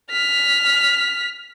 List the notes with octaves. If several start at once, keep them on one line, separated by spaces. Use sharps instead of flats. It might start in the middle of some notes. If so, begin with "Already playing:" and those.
F6 B6